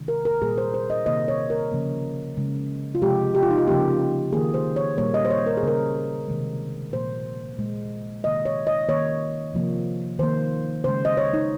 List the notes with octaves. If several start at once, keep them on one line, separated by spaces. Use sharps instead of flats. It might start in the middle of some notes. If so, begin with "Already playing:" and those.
Already playing: C3 D#3 G#3
A#4
A#4
A#2 G3 A#3 G#4
C5
C5
D#5
C3 D#3 A#3 D#5
C#5
A#4
C#3 F3 A#3
C#3 G#3
F4
C3 F3 G#3 G4
G4
F4
D#4
F4
C#3 F3 A#3 G4
D#3 A#3 G#4
C5
C#5
A#2 G3 A#3 C#5
D#5
C5
C#5
A#4
G#4
C#3 G3 A#3 A#4
C3 D#3 G#3
A#2 F3 A#3 C5
A#2 G#3
C3 D#3 A#3 D#5
C#5
D#5
D#3 A#3 C#5
C3 F3 A#3
D#3 A#3 C5
C#3 G#3 C5
D#5
C#5
D#4